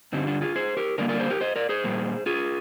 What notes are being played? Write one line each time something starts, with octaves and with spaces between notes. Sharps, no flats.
G2 D3 G3 C4 D#4
D4 F4
F4 G#4
G#4 C5
G4 A#4
D3 G3 A#3 A#4 D5
A#4 D5
G#4 C5
G4 A#4
C5 D#5
A#4 D5
G#4 C5
A#2 G3 A#3
F4 G#4